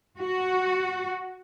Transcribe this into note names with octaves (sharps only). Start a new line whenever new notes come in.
F#4